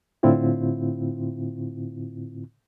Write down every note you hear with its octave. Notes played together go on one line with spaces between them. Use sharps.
A2 D3 C4 E4 F4